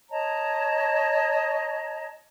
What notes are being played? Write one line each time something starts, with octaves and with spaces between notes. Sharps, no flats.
C#5 D#5 A5 A#5